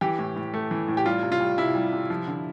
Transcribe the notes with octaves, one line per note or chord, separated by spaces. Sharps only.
E3 G4
A2
A2
A3
E3
A2
G4
G3 F4
C3
F4
G3
C3 E4
G3
C3
F3
D3